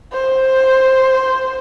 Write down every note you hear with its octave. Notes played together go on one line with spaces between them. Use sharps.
C5